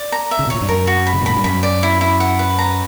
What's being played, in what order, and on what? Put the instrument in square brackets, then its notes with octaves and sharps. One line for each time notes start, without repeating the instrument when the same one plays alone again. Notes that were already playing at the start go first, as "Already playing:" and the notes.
Already playing: [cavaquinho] D5
A#5
E5
[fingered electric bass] C#3
B2
[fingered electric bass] A#2 [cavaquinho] C#5
[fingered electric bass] G2
[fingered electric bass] F#2 [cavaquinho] A#4
[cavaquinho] F#4
B5
[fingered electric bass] C#3
B2
[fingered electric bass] A#2 [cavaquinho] B5
[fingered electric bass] G2
[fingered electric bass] F#2 [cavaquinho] B5
[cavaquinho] D5
E4
E4
F#5
B4
A#5